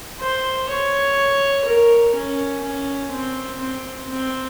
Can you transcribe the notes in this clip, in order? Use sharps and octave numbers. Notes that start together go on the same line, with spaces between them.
C5
C#5
A#4
C#4
C#4
C4
C4
C4